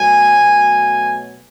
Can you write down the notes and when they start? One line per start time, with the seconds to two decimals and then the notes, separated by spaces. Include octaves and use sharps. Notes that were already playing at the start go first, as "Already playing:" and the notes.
Already playing: B2 F#3 A3 G#5
0.37 B2 F#3 A3